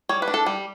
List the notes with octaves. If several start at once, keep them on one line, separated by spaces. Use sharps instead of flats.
G3 C#5
B4
D4
A4
G3